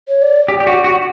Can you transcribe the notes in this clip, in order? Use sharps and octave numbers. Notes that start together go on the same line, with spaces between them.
C#5
D5
G4
G4
F#4
F#4